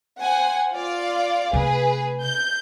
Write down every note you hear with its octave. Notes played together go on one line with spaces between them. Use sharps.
C5 F#5 G#5
F4 D5 F5
C3 A3 G#4 B4
G6